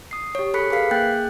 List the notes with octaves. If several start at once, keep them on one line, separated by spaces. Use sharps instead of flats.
D#6 C7
G4 C#5
G#4 A4 B5 F#6 B6 C#7
G#4 A#4 B4 F5 B6 C7
A#3 G#4 G5 F#6 G6 A6